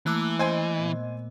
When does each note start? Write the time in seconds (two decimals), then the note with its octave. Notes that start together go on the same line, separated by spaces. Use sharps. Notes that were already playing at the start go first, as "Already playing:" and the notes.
0.06 E3 A3 A#3 A5 D6 E6 F#6
0.39 C5 D#5 G#5 C6
0.79 A#2 B3